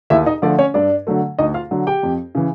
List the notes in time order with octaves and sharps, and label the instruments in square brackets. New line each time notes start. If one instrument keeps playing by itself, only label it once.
[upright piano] D#2 E4 E5
D#4 D#5
D3 F3 A3 D4 D5
C#4 C#5
G2 D4 D5
D3 F#3 A3
D2 D#4 D#5
F4 F5
D3 F#3
G4 G5
F2
C#3 E3